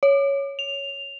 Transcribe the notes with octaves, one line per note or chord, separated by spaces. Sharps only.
C#5
F7